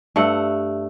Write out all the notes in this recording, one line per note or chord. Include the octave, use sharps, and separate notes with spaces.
G2 A3 F#5